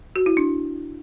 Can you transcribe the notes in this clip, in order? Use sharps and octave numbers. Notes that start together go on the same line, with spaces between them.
F#4
E4
D4